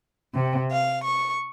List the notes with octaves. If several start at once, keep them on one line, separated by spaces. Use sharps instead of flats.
C3
F5
C#6